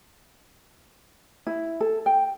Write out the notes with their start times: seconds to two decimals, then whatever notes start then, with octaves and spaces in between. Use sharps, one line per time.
1.47 E4
1.81 A4
2.06 G5